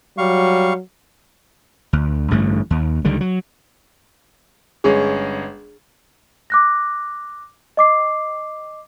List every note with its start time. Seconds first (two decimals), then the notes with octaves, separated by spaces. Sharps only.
0.18 F#3 G3 F5 C#6
1.93 D2
2.31 A1 G2 D3 A3
2.71 D#2
3.05 C#2 D3 D#3 G3
3.21 F#3
4.84 G1 G#3 C#4 G#4
6.50 D6 F#6 A#6
7.77 D#5 D6 C7